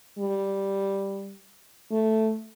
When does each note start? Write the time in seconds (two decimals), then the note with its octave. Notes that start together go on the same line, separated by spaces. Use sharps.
0.18 G3
1.91 A3